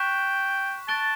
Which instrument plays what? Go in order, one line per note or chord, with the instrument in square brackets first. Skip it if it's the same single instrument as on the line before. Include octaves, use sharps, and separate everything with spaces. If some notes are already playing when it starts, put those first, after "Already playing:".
Already playing: [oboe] G5 [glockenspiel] C#6 F#6 B6 E7
[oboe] A5 [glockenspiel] C#6 F#6 A6 D7 G7